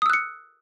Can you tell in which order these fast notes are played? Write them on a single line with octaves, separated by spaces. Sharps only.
D#6 E6 F#6 C#7